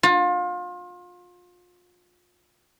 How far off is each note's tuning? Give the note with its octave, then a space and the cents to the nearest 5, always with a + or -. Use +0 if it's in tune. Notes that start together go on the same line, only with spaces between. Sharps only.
F4 +30